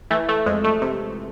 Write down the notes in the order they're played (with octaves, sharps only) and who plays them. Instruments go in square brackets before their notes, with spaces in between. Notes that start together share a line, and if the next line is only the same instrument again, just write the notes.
[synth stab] E3 A3
A3
F2 G#3
A3
C3